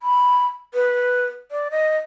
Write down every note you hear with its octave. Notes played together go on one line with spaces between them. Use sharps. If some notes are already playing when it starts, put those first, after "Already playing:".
B5
B4
D5
D#5